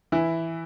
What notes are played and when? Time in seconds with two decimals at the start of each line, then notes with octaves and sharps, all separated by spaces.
0.12 E3 E4